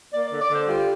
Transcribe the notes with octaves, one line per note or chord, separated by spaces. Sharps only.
A#3 D5
D3 D5
D5
D3
C5
G3 F4